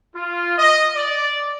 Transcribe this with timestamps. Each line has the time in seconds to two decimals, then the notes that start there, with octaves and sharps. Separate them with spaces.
0.14 F4
0.58 D#5
0.94 D5